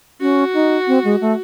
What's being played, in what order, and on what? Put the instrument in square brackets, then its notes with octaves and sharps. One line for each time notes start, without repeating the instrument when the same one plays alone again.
[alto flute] C#4 [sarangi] F#4
[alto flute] D#4
C4
G#3
A3